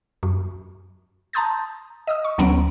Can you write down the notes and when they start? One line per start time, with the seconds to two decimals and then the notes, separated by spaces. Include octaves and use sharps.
0.23 F#2
1.33 A5 A#5 C6 D#6 G6 A6
2.07 D#5 D#6 E6
2.24 C#6
2.38 D2 F#3 B3 C#4 A#5 D7